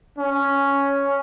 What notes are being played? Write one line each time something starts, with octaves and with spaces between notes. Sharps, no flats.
C#4